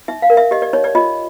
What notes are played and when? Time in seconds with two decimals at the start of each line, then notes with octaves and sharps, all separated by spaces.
0.08 D#4 E5
0.22 F5
0.30 A#4
0.37 E5
0.51 G4 D#5
0.62 D5
0.73 D#4 C#5
0.84 D5
0.95 F4 D#5